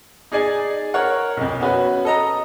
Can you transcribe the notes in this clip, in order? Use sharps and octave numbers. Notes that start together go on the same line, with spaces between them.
D#4 G#4 D5 G#5
A#4 C#5 F#5
B1 F2
B3 C#4 F#4 B4
A4 D#5 A#5